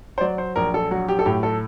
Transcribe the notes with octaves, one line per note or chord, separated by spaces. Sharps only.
C5
F#3 D5
C5
A#1 A#4
A4
F#3 F#4
G4
A4
A2 G4
A4